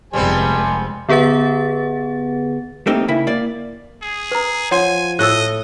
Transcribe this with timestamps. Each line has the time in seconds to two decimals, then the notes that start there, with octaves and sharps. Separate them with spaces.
0.13 F1 G3 G#3 B3 C4 C5 G#5 A5
1.09 D3 B3 G#4 B4 F#5 A6
2.87 A3 A#3 C4 D#4 G4
3.08 C#3 A#3 E4
3.27 A#3 D5
4.02 G#4
4.31 B4 A#5
4.71 F3 C#5 F#5 G#5 C6
5.19 A2 A4 D#5 E6 F#6